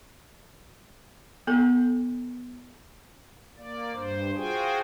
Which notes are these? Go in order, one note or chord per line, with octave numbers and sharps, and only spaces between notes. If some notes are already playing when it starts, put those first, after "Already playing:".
B3 A4
A#3 D5
G2 C5
F4 F#4 G#4 C5 G5 G#5